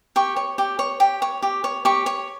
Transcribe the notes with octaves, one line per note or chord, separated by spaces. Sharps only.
G4 C#6
C#5
G4
C#5
G4
C#5
G4
C#5
G4 C#6
C#5